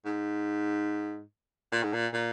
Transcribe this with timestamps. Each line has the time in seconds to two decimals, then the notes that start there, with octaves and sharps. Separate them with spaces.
0.05 G#2
1.72 A#2
1.83 G#2
1.93 A#2
2.13 A#2